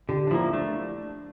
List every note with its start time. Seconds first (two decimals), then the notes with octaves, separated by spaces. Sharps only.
0.09 D3 G4
0.27 D4
0.30 F3 A#3 E4
0.53 A3 D4